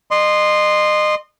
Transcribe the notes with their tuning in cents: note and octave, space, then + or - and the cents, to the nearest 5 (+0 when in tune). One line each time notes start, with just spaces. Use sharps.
D#5 -30 C6 +0